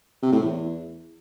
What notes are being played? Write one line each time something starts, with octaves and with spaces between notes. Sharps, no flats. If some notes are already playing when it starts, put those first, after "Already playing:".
C3
A2
E2